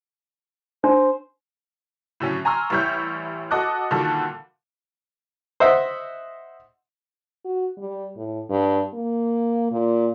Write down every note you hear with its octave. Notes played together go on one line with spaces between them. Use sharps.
D4 C5
A2 D3 F#3 C#4
G#5 A#5 C6 C#6 E6 F6
A1 E3 G3 C#5 E5 G6
F#4 A4 D#5 D6 F#6
A#2 D3 D#3 G3 F#4 A4
C5 D#5 E5 F#5
F#4
G3
A2
G2
A#3
A#2